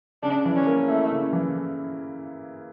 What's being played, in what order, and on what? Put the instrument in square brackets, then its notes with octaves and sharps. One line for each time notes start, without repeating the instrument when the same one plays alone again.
[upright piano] C#3 [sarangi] D4
[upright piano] E3
[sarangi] C#4
[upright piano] A#3
[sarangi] A3 [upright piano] E4
[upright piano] C#3
E3